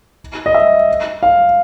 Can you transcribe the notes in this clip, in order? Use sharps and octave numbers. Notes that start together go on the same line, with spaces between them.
D#5
E5
F5